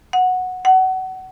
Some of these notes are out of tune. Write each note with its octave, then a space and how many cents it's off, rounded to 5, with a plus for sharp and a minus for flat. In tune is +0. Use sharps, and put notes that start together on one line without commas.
F#5 -10
F#5 +25